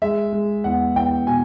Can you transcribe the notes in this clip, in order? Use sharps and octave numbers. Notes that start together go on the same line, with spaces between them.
G#3 E5
G#3
E2 F#5
E2 G5
B2 G#5